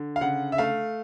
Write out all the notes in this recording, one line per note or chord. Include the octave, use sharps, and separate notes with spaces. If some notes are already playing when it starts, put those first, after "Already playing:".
Already playing: D3
F5
C#3 F#5
E5
A3 F5